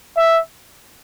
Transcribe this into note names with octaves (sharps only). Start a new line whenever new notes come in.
E5